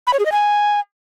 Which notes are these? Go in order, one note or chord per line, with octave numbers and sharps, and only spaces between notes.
B5
C#5
G#4
D#5
G#5